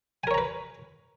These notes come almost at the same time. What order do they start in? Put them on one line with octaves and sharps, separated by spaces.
G#5 A#4 C#5 A#5 B4